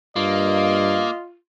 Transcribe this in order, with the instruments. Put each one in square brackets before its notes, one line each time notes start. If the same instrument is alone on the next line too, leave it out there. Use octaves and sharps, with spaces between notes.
[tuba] G2 [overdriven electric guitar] A#3 [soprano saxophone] F4 [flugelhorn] D#5